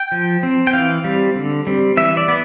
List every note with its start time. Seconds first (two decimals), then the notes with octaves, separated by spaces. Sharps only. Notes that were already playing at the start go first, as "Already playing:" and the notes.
Already playing: G5
0.12 F3
0.43 C4
0.67 G5
0.73 E3 F5
1.04 G3 C4
1.35 D3
1.67 G3 C4
1.97 E3 E5
2.17 D5
2.28 B3